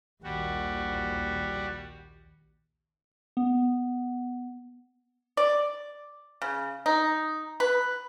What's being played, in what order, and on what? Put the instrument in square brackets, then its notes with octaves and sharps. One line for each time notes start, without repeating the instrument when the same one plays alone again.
[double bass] A#1 D#2 [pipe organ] G3 F#4
[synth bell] B3
[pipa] D5
C#3
D#4
B4